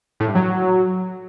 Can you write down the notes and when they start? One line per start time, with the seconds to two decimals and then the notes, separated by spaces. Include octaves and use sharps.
0.20 A2
0.28 G2
0.35 F#3